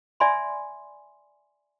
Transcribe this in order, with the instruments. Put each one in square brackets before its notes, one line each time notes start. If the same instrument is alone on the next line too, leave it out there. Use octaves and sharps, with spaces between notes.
[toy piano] D5 E5 G#5 B5 C6